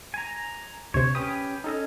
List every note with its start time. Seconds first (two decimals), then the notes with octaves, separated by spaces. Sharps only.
0.14 G#5 A#5
0.94 D2 C3 C5 C#5
1.15 C#4 G4 B4 D#6
1.64 C#4 D#4 A4 D#5